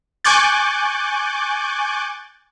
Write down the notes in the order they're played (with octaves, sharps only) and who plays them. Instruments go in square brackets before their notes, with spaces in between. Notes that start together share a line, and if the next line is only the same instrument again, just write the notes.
[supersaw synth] G#5 C#6 D6 F#6 G6 A6